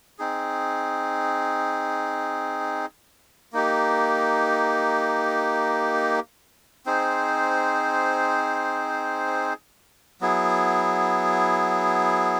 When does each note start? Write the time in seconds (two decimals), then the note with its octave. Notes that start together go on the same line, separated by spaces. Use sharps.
0.19 C4 D#4 G#4
3.53 A#3 D#4 G4
6.86 C4 D#4 G#4 C5
10.21 F#3 B3 E4 G#4